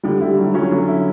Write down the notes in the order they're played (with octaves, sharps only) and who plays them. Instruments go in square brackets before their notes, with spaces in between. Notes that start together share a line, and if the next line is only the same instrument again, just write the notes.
[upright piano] D3 [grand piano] G3
[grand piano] G3 [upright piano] E4
[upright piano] F#3 [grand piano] G3
[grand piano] F#3 [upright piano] C#4
[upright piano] D3
E4